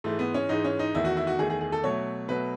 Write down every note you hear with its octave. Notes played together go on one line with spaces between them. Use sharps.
G#2 E3 G#3 A3
B3
C#4
G#2 E3 G#3 D#4
C#4
D#4
E2 D#3 A3 E4
F#4
E4
F#4
E2 D#3 A3 G#4
G#4
G#4
A4
B2 F#3 A3 C#5
B2 F#3 A3 B4